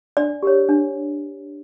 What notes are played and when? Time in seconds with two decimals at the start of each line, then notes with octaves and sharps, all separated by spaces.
0.17 D4 D5
0.43 G4 A#4 C#5
0.69 D4